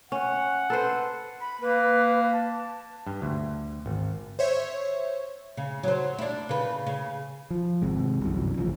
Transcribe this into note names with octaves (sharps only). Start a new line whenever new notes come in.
C#4 F#5
A4 B4 C5
B5
A#3 B4
A5
G2
D2
G#1
C5 C#5 E5
C#3
F#3 C5
D4 E4
C#3 B4
C#3
F3
G#1 C3 G#3
G1 C2 F#2 E3
A1 G2 C#3 F3